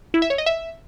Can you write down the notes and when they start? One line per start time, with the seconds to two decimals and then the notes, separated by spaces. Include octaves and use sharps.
0.14 E4
0.22 E5
0.30 C#5
0.38 D#5
0.46 E5